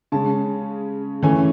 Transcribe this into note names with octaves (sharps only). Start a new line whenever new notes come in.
C#3 G#3 C#4 A5
E3 A3 C#4 G#5